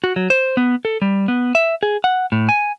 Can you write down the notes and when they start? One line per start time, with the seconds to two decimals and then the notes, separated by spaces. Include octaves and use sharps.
0.04 F#4
0.16 F#3
0.30 C5
0.57 B3
0.85 A4
1.02 G3
1.28 B3
1.55 E5
1.83 G#4
2.04 F#5
2.32 A2
2.49 G#5